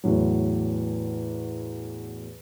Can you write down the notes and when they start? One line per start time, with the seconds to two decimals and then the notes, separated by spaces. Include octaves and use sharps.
0.04 E2 A2 F#3